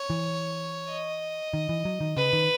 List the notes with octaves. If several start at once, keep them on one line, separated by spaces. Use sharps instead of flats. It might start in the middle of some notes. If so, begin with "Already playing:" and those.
Already playing: C#5
E3
D#5
D#3
E3
F#3
D#3
C#3 B4
D#3